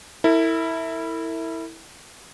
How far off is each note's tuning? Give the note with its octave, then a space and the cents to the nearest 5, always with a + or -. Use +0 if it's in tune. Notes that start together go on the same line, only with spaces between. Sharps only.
E4 -10 A#4 -45